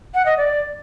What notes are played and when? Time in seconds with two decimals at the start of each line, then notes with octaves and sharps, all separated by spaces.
0.14 F#5
0.26 D#5
0.37 D5